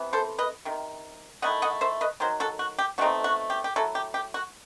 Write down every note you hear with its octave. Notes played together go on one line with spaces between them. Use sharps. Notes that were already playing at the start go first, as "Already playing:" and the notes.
Already playing: C3 E3 B3
A4 C5
B4 D#5
C3 D#3
D#3 A3 E4 D#5 F#5
D#5 F#5
C5 E5
B4 D#5
D#3 F#3 C5
F#4 A4
F#4
G4
B2 A3 C4 D#4 F#4
F#4
G4
G4
F#3 A3 E4 F#4 A4
G4
G4
F#4